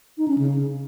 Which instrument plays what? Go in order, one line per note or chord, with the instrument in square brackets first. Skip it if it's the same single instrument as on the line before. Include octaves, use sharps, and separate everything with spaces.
[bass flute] D#4
C#4
C#3